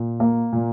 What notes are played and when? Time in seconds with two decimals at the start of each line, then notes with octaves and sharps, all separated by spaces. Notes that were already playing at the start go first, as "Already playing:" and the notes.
Already playing: A#2
0.20 A#3
0.53 A#2